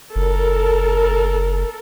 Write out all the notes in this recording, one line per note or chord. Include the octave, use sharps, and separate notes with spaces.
F#1 A4 A#4